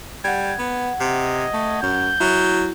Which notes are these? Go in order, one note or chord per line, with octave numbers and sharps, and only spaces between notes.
G3 F#5 G#6
B3
C3 D#5
A3
F#2 G6
F#3 E4